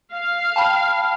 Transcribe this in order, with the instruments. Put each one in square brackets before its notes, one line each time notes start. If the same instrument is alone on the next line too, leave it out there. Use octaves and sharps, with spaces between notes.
[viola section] F5
[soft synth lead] G5 [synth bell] A5 B5